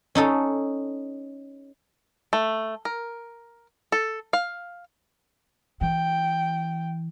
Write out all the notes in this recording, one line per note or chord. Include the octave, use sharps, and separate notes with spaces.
C#4 D#4 A4
A3
A#4
A4
F5
E3 G5